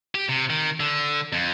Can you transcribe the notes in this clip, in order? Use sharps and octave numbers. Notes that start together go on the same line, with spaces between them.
G4
C3
D#3
D3
F2